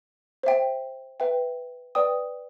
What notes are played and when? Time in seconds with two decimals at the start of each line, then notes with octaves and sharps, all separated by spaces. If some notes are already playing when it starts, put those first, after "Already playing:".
0.43 C5 E5 G5
1.20 B4 E5 G5
1.95 B4 D5 G5 D#6